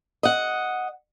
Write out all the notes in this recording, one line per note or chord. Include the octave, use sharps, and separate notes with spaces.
D#5 F#5